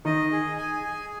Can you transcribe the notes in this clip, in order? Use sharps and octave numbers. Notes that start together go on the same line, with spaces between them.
D#3 D#4 D#5
G#4
G#5
G#4